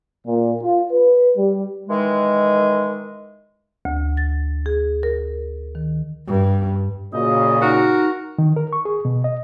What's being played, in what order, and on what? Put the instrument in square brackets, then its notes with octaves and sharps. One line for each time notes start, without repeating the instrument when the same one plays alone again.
[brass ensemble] A#2
F4
B4
G3
[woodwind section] D#3 E3 G#3
[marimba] D2
A6
G#4
A#4
D#3
[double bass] G2
[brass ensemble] A#2 C#3 [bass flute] F#4 [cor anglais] D#5
[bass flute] D#4 [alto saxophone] F#4 [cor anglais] A#4
[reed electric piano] D#3
A#4
C#6
G#4
B2
D#5